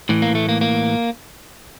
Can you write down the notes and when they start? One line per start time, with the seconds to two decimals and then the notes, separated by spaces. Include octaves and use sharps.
0.09 A2 E3
0.22 A#3
0.35 A3
0.49 A#3
0.61 A#3